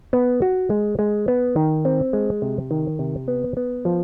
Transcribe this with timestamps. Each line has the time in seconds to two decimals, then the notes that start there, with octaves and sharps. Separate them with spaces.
0.13 B3
0.42 F#4
0.70 G#3
0.99 G#3
1.28 B3
1.56 D#3
1.85 C4
2.13 G#3
2.42 C3
2.71 D#3
2.99 C3
3.28 B3
3.57 B3
3.85 F3